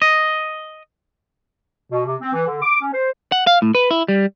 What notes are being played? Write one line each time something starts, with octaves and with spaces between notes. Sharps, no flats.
D#5
B2
C3
C4
E3
D3
D6
C#4
C5
F#5
F5
A2
B4
E4
G3